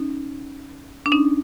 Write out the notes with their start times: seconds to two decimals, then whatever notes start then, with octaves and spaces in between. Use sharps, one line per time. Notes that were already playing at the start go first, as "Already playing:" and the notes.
Already playing: C#4 D#4
1.06 D4
1.12 C#4 D#4